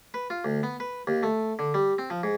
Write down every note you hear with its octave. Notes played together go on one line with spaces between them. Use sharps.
B4
F4
D2
B3
B4
D#2
A3
D3
G3
C4
F3
G#2